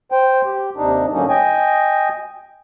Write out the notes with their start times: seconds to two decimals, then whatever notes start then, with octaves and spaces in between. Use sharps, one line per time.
0.12 C5 G5
0.45 G4
0.77 D#2 C3 D4 D#4
1.12 G#2 D3 F#3 A#3 C#4 D#4
1.29 D#5 G5 G#5